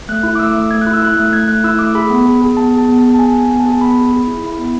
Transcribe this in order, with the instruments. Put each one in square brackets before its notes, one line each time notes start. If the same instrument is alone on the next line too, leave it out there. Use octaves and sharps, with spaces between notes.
[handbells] A3 F#6
E4
D6
A3 E6
A3
A3 G#6
F#6
E4
E6
E4 F#6
A3
A3 G#6
A3 F#6
E4 E6
A3 D6
G#4 B5
B3
G#4
G#4
B3 A5
G#4
A5
B3
A5
G#4
A5
B3 G#5
B3 G#5
B3
A5
G#4
A5
B3 B5
G#4
G#4
E4
E4
B3